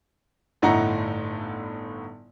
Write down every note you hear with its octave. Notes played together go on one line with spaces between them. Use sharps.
G1 A2 D#4 E4 F#5 A#5